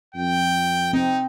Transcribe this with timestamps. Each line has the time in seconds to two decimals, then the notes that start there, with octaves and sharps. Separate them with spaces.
0.15 F2 G5
0.93 C4 D#4